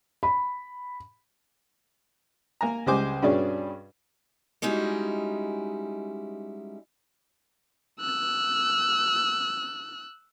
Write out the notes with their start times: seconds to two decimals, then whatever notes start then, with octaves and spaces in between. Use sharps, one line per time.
0.23 B5
2.61 A#3 G#5 A#5
2.86 C#2 G3 G#3 C5 G#5 D6
3.22 G2 B2 C#4 D4 G#4 D5
4.62 G3 G#3 C#4 D#4 E4 F#4
8.00 E6 F#6